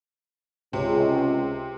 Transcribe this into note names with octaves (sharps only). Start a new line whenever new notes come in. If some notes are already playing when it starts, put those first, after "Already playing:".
C#2 C3